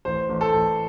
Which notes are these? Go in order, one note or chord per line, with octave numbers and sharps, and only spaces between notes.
A1 C5
A1
A4
A1